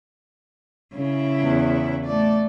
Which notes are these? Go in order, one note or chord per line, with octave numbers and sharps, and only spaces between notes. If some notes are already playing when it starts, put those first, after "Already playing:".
C#3 E4
E2
A3 D5